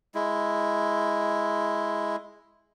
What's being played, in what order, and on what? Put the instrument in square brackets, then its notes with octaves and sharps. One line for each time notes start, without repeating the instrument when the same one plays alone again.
[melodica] G#3 E4